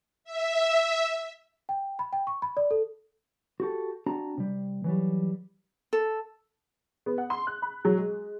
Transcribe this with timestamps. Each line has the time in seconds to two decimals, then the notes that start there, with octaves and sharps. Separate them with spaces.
0.24 E5
1.69 G5
1.99 B5
2.13 G5
2.27 C#6
2.42 B5
2.57 D5
2.71 A4
3.60 F#4 G4 A4
4.06 C4 D4 F#4 A5 A#5
4.38 C3 G3
4.84 E3 F#3 G3
5.93 A4
7.06 B3
7.18 F#5
7.30 C6
7.47 F#6
7.62 B5
7.85 F#3
7.97 G#3